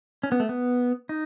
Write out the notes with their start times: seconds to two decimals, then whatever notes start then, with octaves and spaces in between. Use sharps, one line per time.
0.23 C#4
0.32 B3
0.40 A3
0.49 B3
1.09 D#4